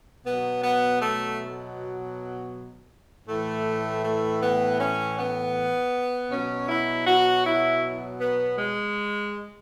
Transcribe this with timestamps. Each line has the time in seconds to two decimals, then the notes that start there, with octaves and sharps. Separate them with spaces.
0.25 B2 F#3 B3
0.62 B3
1.01 A3
3.28 A2 E3 A3
4.04 A3
4.41 B3
4.80 C#4
5.17 B3
6.31 B2 F#3 C#4
6.69 E4
7.07 F#4
7.46 E4
8.21 B3
8.58 G#3